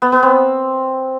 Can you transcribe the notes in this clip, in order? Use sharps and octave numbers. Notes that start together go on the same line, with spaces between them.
B3
B3
C4